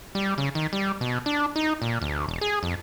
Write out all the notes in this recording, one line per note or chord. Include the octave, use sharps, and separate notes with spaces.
G3
C#3
D#3
G3
B2
D4
D#4
A#2
D2
E1
G#4
F2